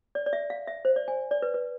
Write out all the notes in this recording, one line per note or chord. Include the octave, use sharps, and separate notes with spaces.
D5
D5
E5
F5
E5
C5
D5
G#5
D5
B4
B4